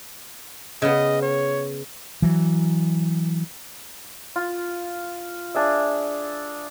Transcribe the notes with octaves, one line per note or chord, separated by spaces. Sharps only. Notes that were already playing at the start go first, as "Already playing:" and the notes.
C#3 B3 D#5
C#5
E3 F#3
F4
D4 G#4 E5